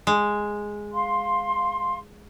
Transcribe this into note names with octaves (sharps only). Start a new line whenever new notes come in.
G#3
F5 C6